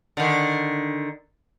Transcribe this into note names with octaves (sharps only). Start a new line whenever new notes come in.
D3 D#3